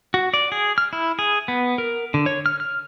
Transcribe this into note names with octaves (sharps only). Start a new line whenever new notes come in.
F#4
D5
G#4
F6
E4
G#4
B3
A#4
D3
C#5
F6
F6